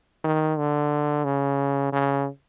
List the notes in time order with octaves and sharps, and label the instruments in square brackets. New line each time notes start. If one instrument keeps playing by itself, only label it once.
[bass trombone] D#3
D3
C#3
C#3